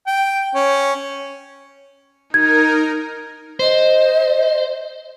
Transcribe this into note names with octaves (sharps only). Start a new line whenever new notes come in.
G5
C#4
D#4 A#4 G#6
C5 D#5